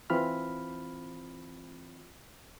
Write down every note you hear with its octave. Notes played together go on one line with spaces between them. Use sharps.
E3 C4 F4 B5 F6